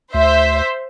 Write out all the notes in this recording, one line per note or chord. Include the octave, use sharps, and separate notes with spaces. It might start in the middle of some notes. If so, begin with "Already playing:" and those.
D2 C5 E5